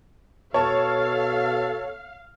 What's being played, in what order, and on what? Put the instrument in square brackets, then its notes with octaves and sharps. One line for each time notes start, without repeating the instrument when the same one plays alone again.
[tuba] B2 [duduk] A4 [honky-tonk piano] C#5 A5 [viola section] F5